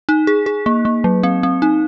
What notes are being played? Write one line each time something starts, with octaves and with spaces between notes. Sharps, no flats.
D#4
G#4
G#4
A#3
A#3
F#3
C4
C4
D#4